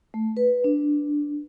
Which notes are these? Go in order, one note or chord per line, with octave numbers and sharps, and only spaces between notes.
A3
B4
D4